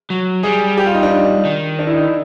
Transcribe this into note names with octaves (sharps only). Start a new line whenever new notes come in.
F#3
G3 G#4
G4
F4
D#4
D4
D#3
D4
E4
D#4
E4